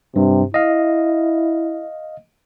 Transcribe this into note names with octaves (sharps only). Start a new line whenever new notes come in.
G2 C3
E4 D#5 F5